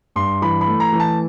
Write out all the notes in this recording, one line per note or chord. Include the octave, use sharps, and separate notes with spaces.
G2 C6
E3 B5
B5
A3
A#5
E3
A5